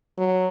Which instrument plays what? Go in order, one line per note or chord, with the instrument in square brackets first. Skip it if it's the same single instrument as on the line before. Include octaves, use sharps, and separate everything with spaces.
[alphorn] F#3